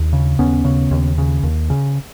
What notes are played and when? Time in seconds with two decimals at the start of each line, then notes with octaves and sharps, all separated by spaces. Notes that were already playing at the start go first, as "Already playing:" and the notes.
Already playing: D#2
0.13 C#3
0.39 D#2 B3 C#4
0.65 C#3
0.91 D#2
1.18 C#3
1.43 D#2
1.70 C#3